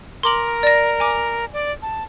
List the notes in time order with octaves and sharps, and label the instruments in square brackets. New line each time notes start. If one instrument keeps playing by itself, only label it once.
[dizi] A#4 [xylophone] C6 D6 F#7
[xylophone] D5 A#6
G#5 D6
[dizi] D5
A5